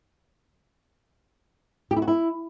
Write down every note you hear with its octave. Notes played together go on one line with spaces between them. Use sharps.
G4
E4
F#4
E4